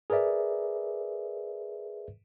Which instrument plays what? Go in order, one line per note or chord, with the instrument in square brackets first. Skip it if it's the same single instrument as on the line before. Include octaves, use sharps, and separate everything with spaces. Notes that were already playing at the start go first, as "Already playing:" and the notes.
[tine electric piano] G#4 A#4 B4 D5 E5